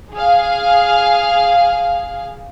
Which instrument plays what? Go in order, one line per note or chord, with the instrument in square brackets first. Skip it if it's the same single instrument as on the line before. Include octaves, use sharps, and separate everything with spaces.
[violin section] G#4 F5